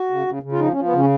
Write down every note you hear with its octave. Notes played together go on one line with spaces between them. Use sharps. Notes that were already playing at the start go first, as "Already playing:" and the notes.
Already playing: F#4
C#3
C#3
C#3
F4
F3 D#4
C#4
F3
B3
C#3 C#4